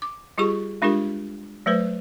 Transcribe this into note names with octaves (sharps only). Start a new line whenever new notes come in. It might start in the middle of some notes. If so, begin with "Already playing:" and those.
D6
G3 F4 G4 G#4 C#6
G#3 D4 F4 G4 A#4
F#3 A3 B4 C5